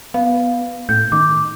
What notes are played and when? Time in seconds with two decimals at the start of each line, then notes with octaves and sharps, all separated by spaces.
0.14 B3 F5
0.89 A2 G6
1.12 D#3 D6